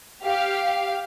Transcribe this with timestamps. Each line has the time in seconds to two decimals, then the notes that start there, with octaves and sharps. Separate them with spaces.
0.23 G4 F5